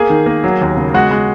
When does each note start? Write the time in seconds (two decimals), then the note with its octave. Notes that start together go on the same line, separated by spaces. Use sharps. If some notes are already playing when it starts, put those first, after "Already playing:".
Already playing: A#3 G#4 G#5
0.10 D#3
0.26 A#3
0.44 F#3
0.61 D#2
0.77 C#3
0.94 G#3 F#4 F#5
1.11 G#3